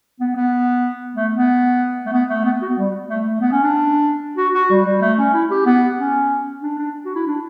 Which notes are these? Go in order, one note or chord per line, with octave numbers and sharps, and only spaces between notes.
B3
B3
A3
B3
A3
B3
A3
B3
F#4
B3
G3
A3
A3
B3
C#4
D4
F#4
F#4
G3
G3
A3
C#4
E4
G4
B3
C#4
D4
D4
F#4
E4
D4